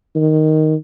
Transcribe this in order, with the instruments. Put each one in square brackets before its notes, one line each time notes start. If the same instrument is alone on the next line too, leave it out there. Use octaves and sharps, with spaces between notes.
[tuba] D#3